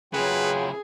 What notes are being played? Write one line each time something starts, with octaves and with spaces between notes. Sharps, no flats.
C#3 F#3 E4 F4 G#4 B4 G5